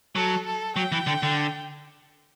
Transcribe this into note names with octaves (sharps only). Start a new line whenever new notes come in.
F#3 A4
A4
F#3 G5
E3
D3
D3